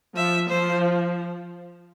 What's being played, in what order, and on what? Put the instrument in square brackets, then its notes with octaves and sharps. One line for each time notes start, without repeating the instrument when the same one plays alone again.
[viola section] F3 [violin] E5
[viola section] F3 [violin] C5